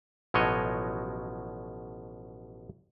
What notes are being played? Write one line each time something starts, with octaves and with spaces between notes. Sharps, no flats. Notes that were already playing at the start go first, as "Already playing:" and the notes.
A1 B2 F3 F#3 C#5 D#5